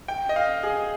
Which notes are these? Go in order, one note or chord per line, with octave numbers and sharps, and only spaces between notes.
G5
D#5
F5
G#4